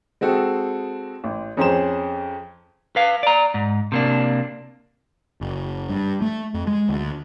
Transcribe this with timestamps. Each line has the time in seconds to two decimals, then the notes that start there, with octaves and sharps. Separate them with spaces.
0.21 G#3 C4 F#4 A4
1.24 A1
1.57 F2 C#4 G#4 C5 A#5 E7
2.96 B4 F5
3.23 D5 A#5
3.54 G#2
3.92 C3 A#3 D4
5.41 F#1
5.89 G2
6.22 A3
6.54 F2
6.67 G#3
6.89 D2